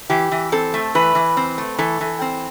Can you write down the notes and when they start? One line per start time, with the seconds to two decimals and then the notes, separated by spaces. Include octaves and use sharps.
0.10 E3 G4
0.32 E3
0.52 C4 A4
0.74 A3
0.95 E3 B4
1.15 E3
1.37 C4
1.58 A3
1.78 E3 A4
2.01 E3
2.21 C4